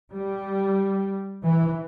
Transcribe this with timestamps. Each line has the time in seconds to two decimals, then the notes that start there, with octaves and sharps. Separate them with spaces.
0.13 G3
1.43 E3